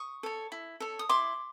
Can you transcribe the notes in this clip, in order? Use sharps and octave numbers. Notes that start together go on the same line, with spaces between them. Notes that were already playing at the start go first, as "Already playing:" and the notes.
Already playing: C#6 D#6
A4 C#5
E4
A4 C#5
D#6
E4 C6 D6